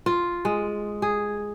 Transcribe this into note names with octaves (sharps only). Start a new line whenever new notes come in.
F4
G#3
G#4